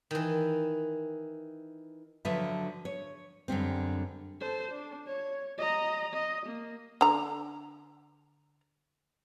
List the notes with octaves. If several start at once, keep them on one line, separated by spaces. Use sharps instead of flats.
D#3 E3
D3 F3 F#3 B4 E5 A5
C#5
F#2 D3 G3 C4
A4 C5
D4
C#5
D#5 A#5
D#5
A#3
D3 A#5